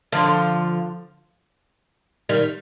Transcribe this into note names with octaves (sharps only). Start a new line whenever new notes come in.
D3 F3
D#3 G3